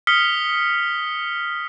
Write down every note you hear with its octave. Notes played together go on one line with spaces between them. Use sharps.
D#6 F6 B6 C#7 G7